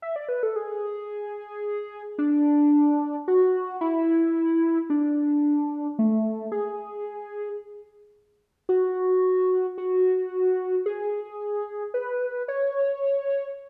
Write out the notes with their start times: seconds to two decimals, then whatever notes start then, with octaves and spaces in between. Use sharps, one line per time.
0.02 E5
0.16 D5
0.29 B4
0.43 A4
0.56 G#4
2.18 D4
3.28 F#4
3.81 E4
4.90 D4
5.99 A3
6.52 G#4
8.69 F#4
9.78 F#4
10.86 G#4
11.94 B4
12.48 C#5